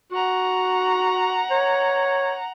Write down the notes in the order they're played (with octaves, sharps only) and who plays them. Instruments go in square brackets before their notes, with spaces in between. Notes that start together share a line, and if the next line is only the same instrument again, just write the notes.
[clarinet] F#4 [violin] F#5 A#5
[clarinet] C#5